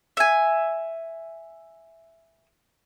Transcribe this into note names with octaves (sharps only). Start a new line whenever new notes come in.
E5 G#5